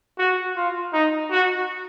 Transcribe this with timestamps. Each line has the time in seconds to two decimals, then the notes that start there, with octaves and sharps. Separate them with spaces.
0.18 F#4
0.56 F4
0.93 D#4
1.31 F#4